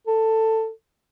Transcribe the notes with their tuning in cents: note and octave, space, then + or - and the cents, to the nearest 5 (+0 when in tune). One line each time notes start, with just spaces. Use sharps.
A4 +15